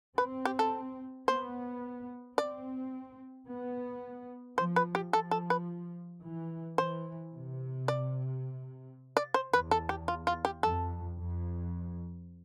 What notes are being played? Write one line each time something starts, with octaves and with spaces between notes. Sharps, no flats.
C4 B4
G4
A4
B3 C5
C4 D5
B3
F3 C5
B4
G4
F3 A4
A4
B4
E3
E3 C5
C3
D5
D5
C5
E2 B4
A4
G4
F4
F4
G4
F2 A4
F2